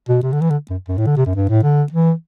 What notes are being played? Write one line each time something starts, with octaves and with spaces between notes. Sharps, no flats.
B2
C3
D3
E3
D3
F#2
F#2
A2
D3
C3
F#2
G2
A2
D3
E3